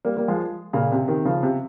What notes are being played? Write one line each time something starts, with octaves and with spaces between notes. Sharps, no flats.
G3 A#3
G3 A#3
F3 G#3
A#2 C#3
C3
C3 D#3
C#3 F3
C3